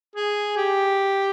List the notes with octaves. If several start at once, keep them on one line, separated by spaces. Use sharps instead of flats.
G#4
G4